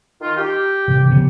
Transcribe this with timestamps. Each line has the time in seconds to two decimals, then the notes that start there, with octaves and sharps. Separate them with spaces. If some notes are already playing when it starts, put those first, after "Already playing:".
0.20 D#3 F4
0.36 G4
0.88 C3 E3
1.10 C#3 F3 B3